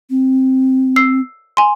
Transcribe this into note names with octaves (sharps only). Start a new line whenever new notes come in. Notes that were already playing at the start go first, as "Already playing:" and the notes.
C4
E6 C7
G#5 C6